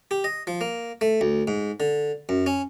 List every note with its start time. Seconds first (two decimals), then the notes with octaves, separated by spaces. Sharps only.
0.11 G4
0.24 D#5
0.47 F3
0.61 A#3
1.01 A3
1.21 D2
1.47 G#2
1.80 D3
2.29 F#2
2.46 C#4